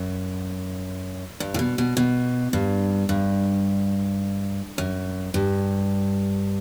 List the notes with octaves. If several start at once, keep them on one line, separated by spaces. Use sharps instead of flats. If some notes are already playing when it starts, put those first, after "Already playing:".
Already playing: F#2
G2
A2
B2
B2
B2
G2
G2
F#2
G2